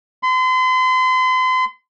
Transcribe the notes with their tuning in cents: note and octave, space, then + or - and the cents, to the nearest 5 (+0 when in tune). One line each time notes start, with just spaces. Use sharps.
C6 -40